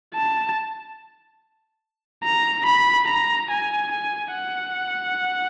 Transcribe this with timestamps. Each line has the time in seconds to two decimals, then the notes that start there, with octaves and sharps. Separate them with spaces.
0.14 A5
2.24 A#5
2.66 B5
3.08 A#5
3.50 G#5
3.91 G#5
4.33 F#5